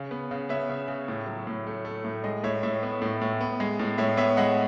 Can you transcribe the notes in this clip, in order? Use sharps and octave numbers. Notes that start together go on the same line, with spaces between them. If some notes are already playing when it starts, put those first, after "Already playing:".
Already playing: C#3
B3
C#3
B3 C#5 E5
C#3
C#3
A2
F#3
A2
A3
A3
A2
G#3 D#5
A2 C#5 E5
A2 C#5 E5
B3
A2
A2
B3
G#3
A2
A2 C#5 E5
B3 C#5 E5
G#3 D#5 F#5